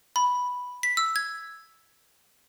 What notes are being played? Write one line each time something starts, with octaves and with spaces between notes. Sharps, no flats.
B5
B6
E6
G#6